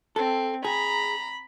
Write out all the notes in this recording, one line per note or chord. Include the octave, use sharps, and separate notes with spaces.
C4 A4
G#4 A#5 B5